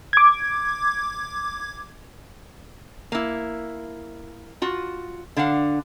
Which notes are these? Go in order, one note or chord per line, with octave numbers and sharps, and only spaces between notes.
D6 G#6
A#3 E4
F4 F#4
D3 D4 F5 F#5